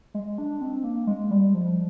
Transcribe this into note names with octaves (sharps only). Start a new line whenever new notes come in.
G#3
D4
C4
A#3
G#3
G3
F3